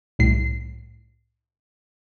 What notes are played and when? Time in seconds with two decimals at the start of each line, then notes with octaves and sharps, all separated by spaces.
0.19 C2 A2 C7